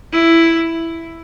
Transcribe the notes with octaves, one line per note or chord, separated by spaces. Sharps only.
E4